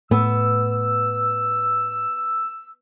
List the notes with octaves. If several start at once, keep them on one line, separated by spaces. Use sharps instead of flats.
A2 B3 E6